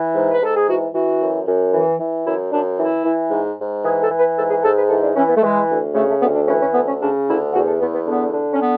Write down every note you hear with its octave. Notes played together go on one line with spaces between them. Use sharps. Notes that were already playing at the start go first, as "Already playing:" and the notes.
Already playing: E3
G#2
B4
G#2 A4
G#4
E3 F#4
E3 F#4
F#2
F#2
E3
E3
F#2 E4
F#2 D4
E3 E4
E3
G#2
G#2
E3 G#4
A4
E3
B4
G#2 A4
G#4
G#2 A4
B4
E3 A4
D4
E3 C#4
B3
A3
E3 G#3
D2
C#3 A3
A3
D2 B3
D4
E3 C#4
C#4
D2 B3
C#4
C#3 D4
D2 E4
E2 F#4
A4
E2 B3
B3
D3 B3
D3
C#4
B3